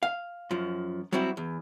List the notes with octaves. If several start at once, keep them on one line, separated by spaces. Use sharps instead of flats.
F5
F#2 F3
F#3 G3 C4 E4 F#4
E2